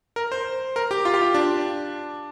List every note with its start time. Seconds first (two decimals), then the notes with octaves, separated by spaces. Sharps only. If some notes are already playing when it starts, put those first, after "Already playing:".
0.16 A#4
0.32 C5
0.76 A#4
0.91 G4
1.05 F4
1.14 G4
1.22 F4
1.34 D4